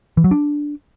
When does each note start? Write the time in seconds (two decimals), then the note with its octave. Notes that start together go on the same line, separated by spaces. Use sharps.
0.17 E3
0.24 F#3
0.31 D4